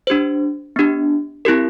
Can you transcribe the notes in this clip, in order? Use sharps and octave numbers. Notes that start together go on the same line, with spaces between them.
D4 G4 C5
B3 D4 G4
C4 E4 G4 A#4